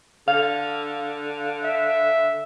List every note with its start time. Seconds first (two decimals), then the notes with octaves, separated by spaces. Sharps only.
0.28 D3 F5
1.65 E5